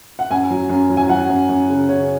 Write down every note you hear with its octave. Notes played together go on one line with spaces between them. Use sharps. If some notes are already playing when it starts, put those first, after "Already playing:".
F#5
F#2 G#5
F#3
F#2
F#3
G#5
F#3 F#5
F#2
F#2
C#3
C#3 C#5